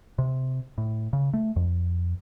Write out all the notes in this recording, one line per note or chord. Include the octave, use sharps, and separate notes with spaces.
C3
A2
C#3
A3
F2